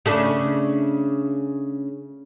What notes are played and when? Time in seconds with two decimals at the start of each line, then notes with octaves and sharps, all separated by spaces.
0.06 C#3 A3 D4